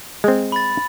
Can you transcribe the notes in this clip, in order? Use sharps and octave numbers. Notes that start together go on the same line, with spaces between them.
G#3 C4
B5 A6